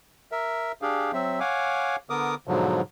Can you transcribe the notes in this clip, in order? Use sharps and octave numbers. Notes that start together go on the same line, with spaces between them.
A#4 E5
D4 G4 G#4 F5
F#3 C4 E5
C#5 F5 F#5 G#5 D6
D3 B3 A#4 D6 D#6
G#2 B2 D3 F3 F#3